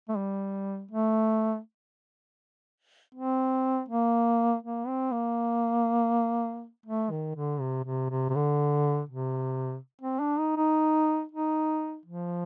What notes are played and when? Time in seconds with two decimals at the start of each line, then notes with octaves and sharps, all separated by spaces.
0.09 A3
0.17 G3
0.91 A3
3.14 C4
3.89 A#3
4.63 A#3
4.87 C4
5.12 A#3
6.86 A3
7.11 D#3
7.35 D3
7.60 C3
7.84 C3
8.10 C3
8.29 C3
8.35 D3
9.09 C3
10.02 C4
10.20 D4
10.39 D#4
10.57 D#4
11.32 D#4
12.05 F3